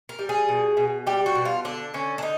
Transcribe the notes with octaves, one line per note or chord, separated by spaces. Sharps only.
A#4
G3
G#4
B2
B2
G3 G4
F#4
B2
F4
D3 D4
D3 C#4
D4
D#4